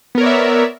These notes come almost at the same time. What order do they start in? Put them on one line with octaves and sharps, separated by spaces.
B3 A#4 C#5 D5 E5